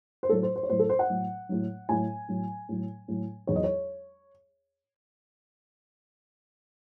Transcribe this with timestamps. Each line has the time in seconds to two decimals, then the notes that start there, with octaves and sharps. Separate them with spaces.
0.23 C5
0.29 A2 F#3 A4
0.43 C5
0.56 C5
0.63 C#5
0.69 A2 F#3 C5
0.79 A4
0.89 C5
0.99 F#5
1.10 A2 F#3
1.49 A2 F#3
1.89 A2 F#3 G#5
2.28 A2 F#3
2.69 A2 F#3
3.08 A2 F#3
3.47 E2 D#3 F#3 C#5
3.55 D#5
3.64 C#5